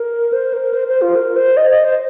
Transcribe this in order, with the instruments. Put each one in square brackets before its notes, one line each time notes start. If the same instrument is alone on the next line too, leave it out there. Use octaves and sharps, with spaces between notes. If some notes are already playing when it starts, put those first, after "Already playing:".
Already playing: [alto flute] A#4
C5
A#4
C5
C5
F4
A#4
C5
D#5
D#5
C5